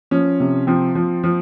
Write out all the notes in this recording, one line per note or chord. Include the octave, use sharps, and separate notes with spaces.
F3 C#4
C3
F3 C4
F3
F3